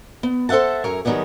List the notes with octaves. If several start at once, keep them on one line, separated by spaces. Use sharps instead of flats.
B3
A4 C5 E5 F#5 A5
F#2 A#4 C#5
D#3 F#3 G3 B3 G#4